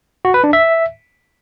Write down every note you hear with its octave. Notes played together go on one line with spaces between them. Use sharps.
F#4
B4
D4
E5